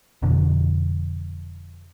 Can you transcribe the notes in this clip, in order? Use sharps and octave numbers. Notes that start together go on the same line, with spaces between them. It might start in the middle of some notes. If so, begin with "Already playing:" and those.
F1 F2 B2 D3